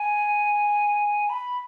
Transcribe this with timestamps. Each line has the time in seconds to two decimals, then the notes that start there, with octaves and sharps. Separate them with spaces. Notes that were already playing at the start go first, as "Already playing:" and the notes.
Already playing: G#5
1.29 B5